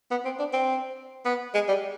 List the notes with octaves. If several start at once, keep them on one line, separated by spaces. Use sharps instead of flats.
B3
C4
D4
C4
B3
G#3
G3